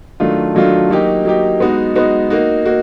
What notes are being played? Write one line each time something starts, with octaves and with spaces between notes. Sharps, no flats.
D#3 F#3 A3 D4 F4
D#3 F#3 A3 D4 F4
F#3 A#3 D#4 G4
F#3 A#3 D#4 G4
G#3 B3 D#4 F#4
G#3 B3 D#4 F#4
A#3 D#4 F#4
A#3 D#4 F#4